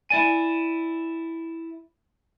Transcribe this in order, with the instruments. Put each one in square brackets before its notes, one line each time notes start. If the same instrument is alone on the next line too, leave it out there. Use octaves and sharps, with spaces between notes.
[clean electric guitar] E4 D5 G#5